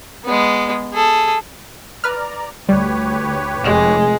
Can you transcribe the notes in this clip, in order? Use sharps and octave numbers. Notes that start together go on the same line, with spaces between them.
G#3 B3
G#4 A4
B4 D5 A#5 F6
D2 G3 G4 B4 C#5
F1 G#3